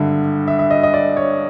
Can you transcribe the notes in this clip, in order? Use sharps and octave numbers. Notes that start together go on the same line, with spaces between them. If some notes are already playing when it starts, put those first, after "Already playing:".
Already playing: G#1 G2 D3 E5
E5
E5
D#5
D#5
D5
C#5